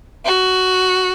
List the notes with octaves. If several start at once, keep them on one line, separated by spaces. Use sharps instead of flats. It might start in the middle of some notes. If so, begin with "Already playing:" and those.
F#4